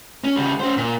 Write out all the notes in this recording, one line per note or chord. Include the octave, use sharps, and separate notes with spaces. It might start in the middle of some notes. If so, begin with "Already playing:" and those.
C#4
C#3 G3
C#4 C5
A#2